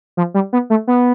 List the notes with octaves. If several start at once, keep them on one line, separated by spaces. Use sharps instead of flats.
F3
G3
B3
A3
B3